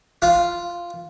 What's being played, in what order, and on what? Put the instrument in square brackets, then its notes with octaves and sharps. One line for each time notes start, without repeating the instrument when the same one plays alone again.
[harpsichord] F4